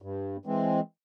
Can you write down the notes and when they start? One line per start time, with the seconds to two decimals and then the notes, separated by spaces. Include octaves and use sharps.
0.02 G2
0.45 E3 G#3 C4